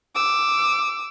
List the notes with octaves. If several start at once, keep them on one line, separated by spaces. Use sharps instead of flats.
D6 E6